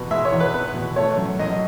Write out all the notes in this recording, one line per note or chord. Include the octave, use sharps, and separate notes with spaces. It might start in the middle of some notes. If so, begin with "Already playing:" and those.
Already playing: E2 B2 B3
G#3 E5
C#5
E2
B4
B3 B4
B2
A3 C#5
F#2
F#2 D#5